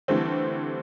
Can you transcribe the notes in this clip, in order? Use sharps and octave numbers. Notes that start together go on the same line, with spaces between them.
D3 E3 G3 A3 C4